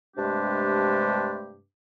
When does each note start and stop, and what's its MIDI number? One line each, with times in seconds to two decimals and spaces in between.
0.17 1.60 43
0.17 1.60 48
0.17 1.60 56
0.17 1.60 57
0.17 1.60 62
0.17 1.60 67